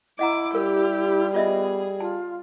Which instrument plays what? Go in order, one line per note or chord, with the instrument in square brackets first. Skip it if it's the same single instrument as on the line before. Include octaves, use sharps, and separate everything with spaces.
[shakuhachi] E4 [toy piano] D#5 F#5 A#5 [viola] D6
[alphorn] G3 [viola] G4 [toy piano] A#4
[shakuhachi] B3 [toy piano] F4 D#5 E5 [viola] G#4
[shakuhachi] F4 [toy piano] A5